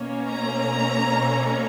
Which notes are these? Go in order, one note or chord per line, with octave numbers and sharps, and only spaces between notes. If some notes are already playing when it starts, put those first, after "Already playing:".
Already playing: B2 A#3 C#4
A#5